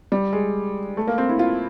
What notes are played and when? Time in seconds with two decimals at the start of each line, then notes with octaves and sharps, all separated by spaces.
0.12 G3
0.33 G#3
0.97 A3
1.07 A#3
1.18 C4
1.29 E4
1.39 F4